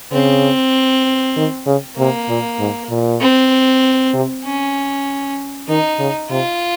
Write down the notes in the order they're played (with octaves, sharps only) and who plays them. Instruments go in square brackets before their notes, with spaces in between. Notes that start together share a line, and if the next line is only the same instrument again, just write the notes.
[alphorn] C#3 [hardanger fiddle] C4
[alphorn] D#3
C#3
[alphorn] C3 [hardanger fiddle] A#3
[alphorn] A#2
G#2
A#2
[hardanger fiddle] C4
[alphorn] C3
[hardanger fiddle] C#4
[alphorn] D#3 [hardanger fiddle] D#4
[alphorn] C#3
[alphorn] C3 [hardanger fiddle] F4